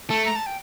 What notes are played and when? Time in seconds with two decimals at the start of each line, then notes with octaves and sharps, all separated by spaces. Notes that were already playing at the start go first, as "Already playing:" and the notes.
0.09 A3 A5
0.25 A#5
0.36 A5
0.46 G5